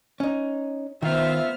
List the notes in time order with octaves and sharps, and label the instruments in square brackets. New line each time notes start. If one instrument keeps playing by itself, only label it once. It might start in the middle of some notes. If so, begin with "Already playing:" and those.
[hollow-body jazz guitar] C#4 D#4
[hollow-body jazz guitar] D#3 [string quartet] B3 C5 F6 [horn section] F4 E5